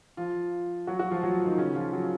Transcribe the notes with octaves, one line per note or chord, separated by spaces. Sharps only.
F3 F4
F#3 F#4
F#3 F#4
F3 F4
F#3 F#4
D#3 D#4
C#3 C#4
F3 F4
F#3 F#4